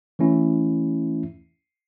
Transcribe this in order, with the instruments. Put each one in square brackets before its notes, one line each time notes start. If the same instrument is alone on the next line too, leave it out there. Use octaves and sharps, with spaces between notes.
[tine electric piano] E3 A3 C#4 E4